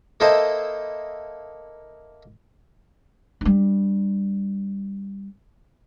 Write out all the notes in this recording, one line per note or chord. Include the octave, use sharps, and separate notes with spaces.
A#3 E4 A4 C5 D#5 A5
G3 D4